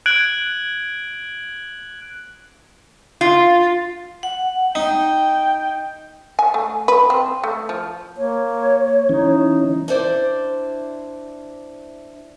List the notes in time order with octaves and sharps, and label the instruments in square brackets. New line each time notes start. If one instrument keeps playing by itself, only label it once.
[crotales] F#6 G#6 D7 F#7
[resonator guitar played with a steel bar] F4
[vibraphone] F#5
[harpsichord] D#4 [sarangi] G5
[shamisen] G#5
A3
B4
C4
A3
F3
[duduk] A#3 [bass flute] C#5
[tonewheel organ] E3 C#4 [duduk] D#4
[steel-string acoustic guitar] D4 E4 C5 D5